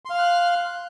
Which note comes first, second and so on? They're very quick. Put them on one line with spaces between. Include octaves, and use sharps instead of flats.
C6 F5 F6 F#6